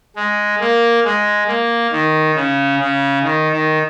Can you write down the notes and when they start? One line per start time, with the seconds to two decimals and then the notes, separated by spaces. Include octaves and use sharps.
0.16 G#3
0.60 A#3
1.04 G#3
1.48 A#3
1.92 D#3
2.35 C#3
2.79 C#3
3.23 D#3
3.52 D#3